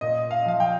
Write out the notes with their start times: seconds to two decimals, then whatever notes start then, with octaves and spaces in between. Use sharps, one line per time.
0.01 A#2 D#5
0.31 F5
0.46 F3 F5
0.60 G5